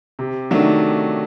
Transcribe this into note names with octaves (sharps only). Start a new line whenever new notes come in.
C3
D#3 F#3 A3 D4